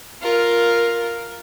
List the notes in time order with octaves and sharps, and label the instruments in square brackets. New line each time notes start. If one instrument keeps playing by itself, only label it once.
[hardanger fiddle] F4 A#4